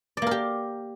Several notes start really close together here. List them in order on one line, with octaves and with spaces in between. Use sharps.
D5 A#3 A#4 G4